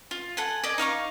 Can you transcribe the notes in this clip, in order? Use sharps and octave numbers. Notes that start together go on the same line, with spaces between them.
F4
A4 F#5 G#5
D5 D#5 G#5
D#4 F5 C#6 D6